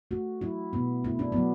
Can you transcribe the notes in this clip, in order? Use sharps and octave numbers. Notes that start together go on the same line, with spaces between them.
A3 F#4
F#3 E4
B2 B3
A3 E4
D4
F#3 B3